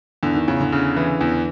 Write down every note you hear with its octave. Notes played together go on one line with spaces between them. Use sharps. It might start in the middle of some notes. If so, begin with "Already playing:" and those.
E2 D3
D#3
E2 C#3
D3
C#3
E3
E2